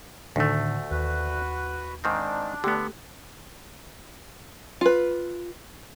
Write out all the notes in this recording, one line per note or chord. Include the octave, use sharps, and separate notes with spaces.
D2 A2 D3 D#3 A3
D#2 F#4 B4
G#2 D#3 C4 D4
D3 A3 B3 G4
F4 B4